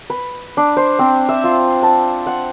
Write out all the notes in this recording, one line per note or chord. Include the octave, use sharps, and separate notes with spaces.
B4
D4
C5
C4
E5
F4
A5
F#5